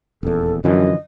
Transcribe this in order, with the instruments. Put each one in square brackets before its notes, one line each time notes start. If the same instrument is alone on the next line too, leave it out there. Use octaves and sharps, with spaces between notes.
[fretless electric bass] D#1 E2 [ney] A4
[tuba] F#2 [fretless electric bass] D3 E3 F3 [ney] D#5